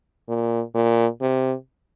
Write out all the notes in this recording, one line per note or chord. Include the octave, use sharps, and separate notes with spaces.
A#2
A#2
C3